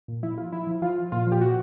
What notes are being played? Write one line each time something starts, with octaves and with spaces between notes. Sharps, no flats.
A#2
F3 E4
F3 F4
F3 E4
F3
F3 F4
F3
A#2 F4
F3
G4
A#2 F#4